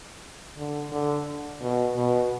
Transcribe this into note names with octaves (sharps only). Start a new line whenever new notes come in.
D3
D3
B2
B2